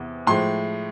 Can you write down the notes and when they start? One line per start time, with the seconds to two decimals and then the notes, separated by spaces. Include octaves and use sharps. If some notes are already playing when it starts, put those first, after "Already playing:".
Already playing: E2 C3 B3
0.27 A2 F3 G#3 C6